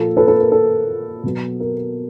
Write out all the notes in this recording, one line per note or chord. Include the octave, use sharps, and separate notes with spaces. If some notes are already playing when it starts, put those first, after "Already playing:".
Already playing: A#2 F3 A#3 A4
A4 B4
A4 B4
A#4
A4
B2 F#3 B3
A#4